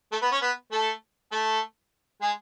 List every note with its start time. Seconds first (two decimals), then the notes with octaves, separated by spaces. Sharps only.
0.12 A3 A4
0.21 B3 B4
0.32 C#4 C#5
0.42 B3 B4
0.72 A3 A4
1.32 A3 A4
2.22 G#3 G#4